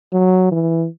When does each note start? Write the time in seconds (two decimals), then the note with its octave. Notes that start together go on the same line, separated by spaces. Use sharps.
0.13 F#3
0.51 E3